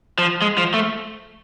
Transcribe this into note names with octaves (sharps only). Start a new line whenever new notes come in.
F3
G#3
F3
A3